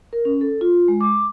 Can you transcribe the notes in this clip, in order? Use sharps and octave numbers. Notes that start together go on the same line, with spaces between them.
A#4
C#4
A4
F4
G#3
D6